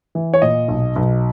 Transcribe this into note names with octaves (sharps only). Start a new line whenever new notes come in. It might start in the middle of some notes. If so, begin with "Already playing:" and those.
E3
C#5
A#2 D#5
B1
B1